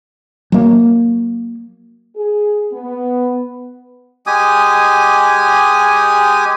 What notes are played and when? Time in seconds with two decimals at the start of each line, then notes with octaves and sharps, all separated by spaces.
0.52 F#3 A#3
2.17 G#4
2.73 B3
4.27 G#3 G4 G#5 D#6